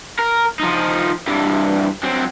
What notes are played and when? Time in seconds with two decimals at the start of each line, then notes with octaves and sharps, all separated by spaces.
0.19 A#4
0.60 F3 D#4
1.28 G2 E3
2.04 F#3 C4